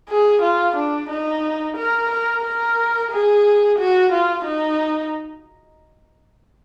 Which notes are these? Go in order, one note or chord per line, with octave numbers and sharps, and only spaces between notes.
G#4
F4
D4
D#4
A#4
A#4
A#4
G#4
F#4
F4
D#4